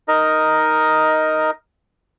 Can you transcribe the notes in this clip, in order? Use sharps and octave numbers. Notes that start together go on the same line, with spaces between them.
D#4 A#4 D#5